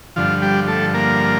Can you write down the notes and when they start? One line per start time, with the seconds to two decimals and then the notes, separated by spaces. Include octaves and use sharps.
0.16 G2 D3 F3 F4
0.42 G3 G4
0.68 A3 A4
0.94 A#3 A#4